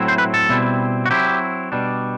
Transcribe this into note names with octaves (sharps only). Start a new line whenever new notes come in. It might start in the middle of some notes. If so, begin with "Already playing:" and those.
Already playing: A2 F#3 C4 E4
C5
B4
A4
B2 G3 C4 E4
F#4
F#3 C4 E4 G4
B2 G3 D4